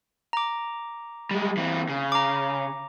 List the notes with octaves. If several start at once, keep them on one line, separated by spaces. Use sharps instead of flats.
A#5 D6
G3 G#3
E3 C4
C#3
A#5 D6